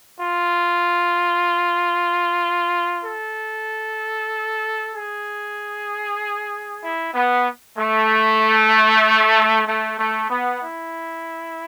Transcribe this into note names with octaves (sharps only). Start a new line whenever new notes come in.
F4
A4
G#4
E4
B3
A3
A3
A3
B3
E4